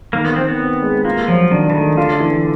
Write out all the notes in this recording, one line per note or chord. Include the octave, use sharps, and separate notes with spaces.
D#3 A#3
B3
D#3 C4
B3
C4
G#3
A#3 F4
F3 F#3
D#3 D4
E3
D#3 A3
D3 F4
E3